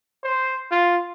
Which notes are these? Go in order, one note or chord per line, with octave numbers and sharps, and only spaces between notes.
C5
F4